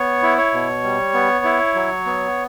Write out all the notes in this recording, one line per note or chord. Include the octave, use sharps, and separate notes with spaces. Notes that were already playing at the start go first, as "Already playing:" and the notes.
Already playing: B3 C#5
E4
C#5
B2
G3
B3
E4
F#3
B3